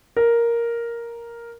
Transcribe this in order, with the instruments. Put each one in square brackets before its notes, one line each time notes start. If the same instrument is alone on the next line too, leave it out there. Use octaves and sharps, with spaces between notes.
[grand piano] A#4